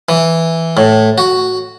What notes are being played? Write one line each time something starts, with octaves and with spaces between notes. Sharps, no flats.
E3
A2
F#4